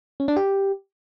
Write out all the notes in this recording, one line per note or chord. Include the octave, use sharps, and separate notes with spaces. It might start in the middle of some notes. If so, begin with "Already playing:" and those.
C#4
D4
G4